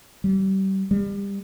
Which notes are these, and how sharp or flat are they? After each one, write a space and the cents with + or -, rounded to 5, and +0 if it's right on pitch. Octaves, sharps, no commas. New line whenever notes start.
G3 -30
G3 +30